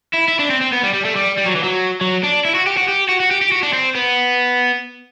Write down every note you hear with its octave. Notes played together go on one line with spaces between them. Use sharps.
E4
E4
D4
C4
C4
B3
G3
G3
A3
G3
G3
F#3
E3
F#3
F#3
D4
E4
F#4
G4
F#4
G4
F#4
F#4
G4
G4
F#4
D4
C4
B3